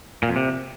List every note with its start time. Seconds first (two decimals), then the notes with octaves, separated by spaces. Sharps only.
0.23 A#2
0.29 F2
0.36 C3